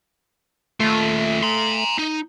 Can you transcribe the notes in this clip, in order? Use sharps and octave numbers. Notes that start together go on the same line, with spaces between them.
D#2 A3 F4
A#5 C6
D#4